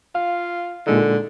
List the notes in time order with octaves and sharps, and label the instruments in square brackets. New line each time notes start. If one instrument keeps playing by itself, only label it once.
[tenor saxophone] F4 [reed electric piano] F5
[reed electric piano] A#2 G#3 D#4 [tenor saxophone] D3